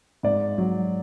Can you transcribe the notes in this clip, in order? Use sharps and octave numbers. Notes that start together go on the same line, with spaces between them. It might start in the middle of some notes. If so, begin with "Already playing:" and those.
G#2 D5
F#3